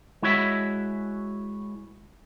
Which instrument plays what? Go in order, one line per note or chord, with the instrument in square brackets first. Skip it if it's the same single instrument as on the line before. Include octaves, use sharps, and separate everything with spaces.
[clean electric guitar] G#3 E4 F#4 C#5 E5